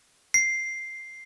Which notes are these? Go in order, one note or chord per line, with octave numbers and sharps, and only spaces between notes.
C7